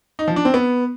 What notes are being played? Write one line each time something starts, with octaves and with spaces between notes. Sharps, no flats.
D#4
F3
D4
C4
B3